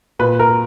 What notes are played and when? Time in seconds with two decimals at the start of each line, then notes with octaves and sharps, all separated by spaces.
0.19 A#2 B4
0.39 A#4